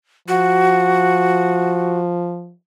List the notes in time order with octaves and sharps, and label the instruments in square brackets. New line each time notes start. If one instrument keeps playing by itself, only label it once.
[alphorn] F3 [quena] F#4